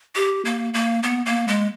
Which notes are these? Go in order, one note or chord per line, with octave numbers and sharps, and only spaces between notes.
G4
A#3
A#3
B3
A#3
G#3